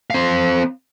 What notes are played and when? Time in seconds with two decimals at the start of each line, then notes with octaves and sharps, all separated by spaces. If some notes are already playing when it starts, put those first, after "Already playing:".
0.10 C4 F5